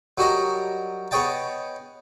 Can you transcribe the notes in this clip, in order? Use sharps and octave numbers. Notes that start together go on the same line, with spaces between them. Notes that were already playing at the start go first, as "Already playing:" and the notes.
F#3 G3 F#4 A#4 D#5
B3 G#4 C#5 D#5 G5 A5